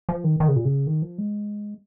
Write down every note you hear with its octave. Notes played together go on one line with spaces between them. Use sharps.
F3
D#3
D#3
C#3
A#2
C#3
D#3
F3
G#3